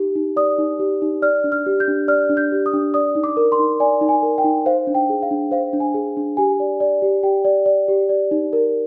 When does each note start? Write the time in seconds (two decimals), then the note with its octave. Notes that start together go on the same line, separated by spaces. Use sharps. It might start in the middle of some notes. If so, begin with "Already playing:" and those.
Already playing: D#4 G4
0.15 D#4
0.36 D5 D#6
0.58 D#4
0.79 G4
1.02 D#4
1.22 D5 F6
1.44 D4
1.52 F6
1.66 G4
1.80 G6
1.88 D4
2.08 D5 F6
2.30 D4
2.37 G6
2.52 G4
2.66 D#6
2.73 D4
2.94 D5 D#6
3.15 D#4
3.24 D6
3.37 A#4
3.52 C6
3.59 D#4
3.80 D5 G#5
4.01 D#4
4.09 G#5
4.23 A#4
4.38 G5
4.44 D#4
4.66 C5 F5
4.87 D4
4.95 G5
5.10 G#4
5.23 F5
5.31 D4
5.51 C5 F5
5.73 D4
5.80 G#5
5.94 G#4
6.17 D4
6.37 G4 G#5
6.60 D5
6.80 D5
7.02 G4
7.23 G4 G5
7.45 D5
7.66 D5
7.88 G4
8.09 D5
8.31 D#4
8.53 A#4